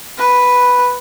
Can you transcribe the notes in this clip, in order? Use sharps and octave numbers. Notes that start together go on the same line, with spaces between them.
B4